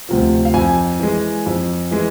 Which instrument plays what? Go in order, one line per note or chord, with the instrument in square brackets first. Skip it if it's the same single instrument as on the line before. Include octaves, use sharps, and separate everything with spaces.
[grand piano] D2 C3 F3
F5
F2 G#5
E3 G#3
F2
E3 G#3